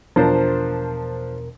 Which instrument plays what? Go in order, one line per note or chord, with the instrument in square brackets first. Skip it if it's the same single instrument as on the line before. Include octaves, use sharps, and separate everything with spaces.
[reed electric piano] E2 B2 A#4 [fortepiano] F3 D4 C5